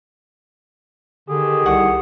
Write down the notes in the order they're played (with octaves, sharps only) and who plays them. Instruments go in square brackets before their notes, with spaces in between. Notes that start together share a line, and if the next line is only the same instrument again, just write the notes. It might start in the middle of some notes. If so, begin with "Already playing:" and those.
[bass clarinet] D3 [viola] D#3 G4 [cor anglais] G#4
[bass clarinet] C2 [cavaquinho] F#5 C#6